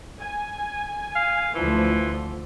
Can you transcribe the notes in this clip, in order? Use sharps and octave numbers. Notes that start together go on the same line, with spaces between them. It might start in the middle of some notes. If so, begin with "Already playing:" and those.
G#5
F5
D2 E3 F3